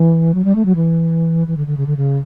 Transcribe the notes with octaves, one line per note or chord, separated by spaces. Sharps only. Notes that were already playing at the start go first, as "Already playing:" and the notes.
Already playing: E3
F#3
G3
A3
F#3
E3
E3
D3
D3
C#3
D3
C#3